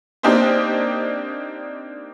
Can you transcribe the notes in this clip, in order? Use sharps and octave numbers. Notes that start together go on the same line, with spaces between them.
A#3 C4 D4 D#4 G4 C5